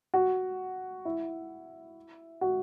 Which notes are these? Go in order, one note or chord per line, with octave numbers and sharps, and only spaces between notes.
F#4
E4
F#4